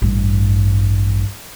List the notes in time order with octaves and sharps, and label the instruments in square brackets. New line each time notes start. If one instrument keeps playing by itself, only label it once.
[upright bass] A1 G2